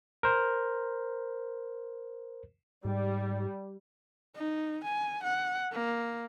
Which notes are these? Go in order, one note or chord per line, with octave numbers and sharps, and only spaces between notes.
A#4 C5
G#2 G3
D#4
G#5
F#5
A#3